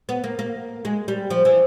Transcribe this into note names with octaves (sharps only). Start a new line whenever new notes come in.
B3
A#3
A#3
G#3
G3
F3
E3